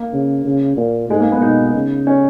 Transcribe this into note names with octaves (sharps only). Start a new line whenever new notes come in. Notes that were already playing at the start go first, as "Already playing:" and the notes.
Already playing: A#3
C#3
C#3
A#2
G#2 G#3
A#3
B3
B2 D#4
C#3
C#4